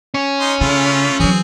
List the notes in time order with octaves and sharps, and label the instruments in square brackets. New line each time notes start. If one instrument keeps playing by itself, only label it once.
[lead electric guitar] C#4
[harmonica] D#4 C6
[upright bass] C#3 [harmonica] A3 F4 B5
[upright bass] E3 F#3 [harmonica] C4 G#4